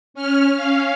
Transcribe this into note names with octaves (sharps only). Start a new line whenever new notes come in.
C#4 F6
C#4 F5